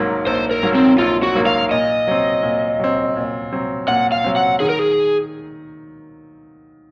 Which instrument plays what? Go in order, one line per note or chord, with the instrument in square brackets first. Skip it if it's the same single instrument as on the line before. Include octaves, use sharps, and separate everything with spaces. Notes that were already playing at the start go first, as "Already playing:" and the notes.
Already playing: [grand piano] A#1 G#2 F#3 A#3
[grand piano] A#1 [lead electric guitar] C5
[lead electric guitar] A#4
[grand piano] G#2 F#3 A#3
[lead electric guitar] C4
[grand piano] A#1 [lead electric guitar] F4
[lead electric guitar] F#4
[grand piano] G#2 F#3 A#3
[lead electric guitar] F5
[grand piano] A#2 [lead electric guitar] D#5
[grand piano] F#3 C4
A#2
F#3 C4
A#2
F#3 C4
[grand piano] A#2 [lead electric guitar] F#5
[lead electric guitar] F5
[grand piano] F#3 C4
[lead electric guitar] F#5
[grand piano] D#3 [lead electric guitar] G#4
[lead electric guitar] A#4
G#4